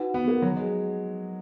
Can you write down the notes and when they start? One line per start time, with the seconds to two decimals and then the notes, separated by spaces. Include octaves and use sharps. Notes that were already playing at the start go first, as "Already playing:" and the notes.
Already playing: D#4 F#4 B4 F#5
0.14 B3
0.28 A#3
0.42 F#3
0.57 G#3